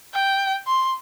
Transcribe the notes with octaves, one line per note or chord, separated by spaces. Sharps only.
G5
C6